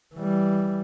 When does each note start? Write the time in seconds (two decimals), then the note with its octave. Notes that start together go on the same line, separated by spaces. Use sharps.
0.15 E3 G3